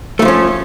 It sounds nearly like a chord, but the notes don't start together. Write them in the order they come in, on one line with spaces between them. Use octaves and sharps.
A3 E3 F3 C#4